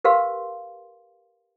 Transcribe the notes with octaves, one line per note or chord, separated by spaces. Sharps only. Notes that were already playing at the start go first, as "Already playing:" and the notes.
G4 A#4 B4 F5 C6